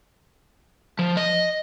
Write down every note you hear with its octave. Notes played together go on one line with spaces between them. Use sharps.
F3
D#5